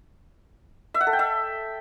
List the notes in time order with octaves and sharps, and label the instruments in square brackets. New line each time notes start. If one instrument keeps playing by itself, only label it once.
[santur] E5
F#5
A4
G5
E5